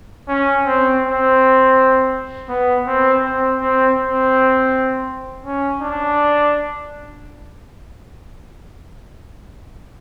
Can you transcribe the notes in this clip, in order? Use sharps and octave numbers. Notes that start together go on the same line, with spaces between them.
C#4
C4
C4
B3
C4
C4
C4
C4
C#4
D4